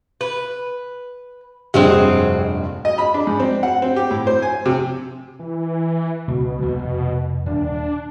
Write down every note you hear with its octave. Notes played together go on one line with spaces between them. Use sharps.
B4
F1 A#1 G2 F#3 G#3 C4 G4
D#5
B5
D4
G#2
C4
F#5
C4
G4
A2
C5
G#5
C3
E3
C#2 B2
D#1 A#1 D#2
F1
D#1 D4